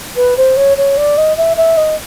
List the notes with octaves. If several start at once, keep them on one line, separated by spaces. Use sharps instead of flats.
B4
C5
C#5
C#5
D5
D#5
E5
E5
D#5